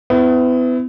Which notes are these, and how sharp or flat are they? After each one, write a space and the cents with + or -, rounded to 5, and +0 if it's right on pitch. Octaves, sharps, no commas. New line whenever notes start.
B3 +40 E4 +0